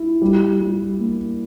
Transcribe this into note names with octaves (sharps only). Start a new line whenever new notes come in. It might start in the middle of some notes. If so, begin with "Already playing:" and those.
Already playing: E4
G3
G3
A#3